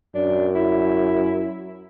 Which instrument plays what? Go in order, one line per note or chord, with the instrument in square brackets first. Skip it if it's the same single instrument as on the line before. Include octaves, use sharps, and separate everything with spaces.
[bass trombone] F#2 [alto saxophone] D4
[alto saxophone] E4